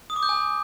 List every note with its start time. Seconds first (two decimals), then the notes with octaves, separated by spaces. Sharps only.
0.10 D#6
0.16 D6
0.23 G6
0.29 G#5